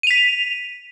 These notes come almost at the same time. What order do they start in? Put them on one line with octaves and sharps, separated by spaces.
D#7 F7 B6